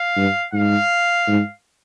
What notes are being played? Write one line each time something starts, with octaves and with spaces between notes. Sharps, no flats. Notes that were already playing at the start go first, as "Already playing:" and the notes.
Already playing: F5
G2
G#2 F5
G#2